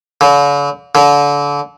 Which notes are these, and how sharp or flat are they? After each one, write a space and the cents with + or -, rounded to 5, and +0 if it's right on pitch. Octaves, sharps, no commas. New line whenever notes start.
D3 -45
D3 -30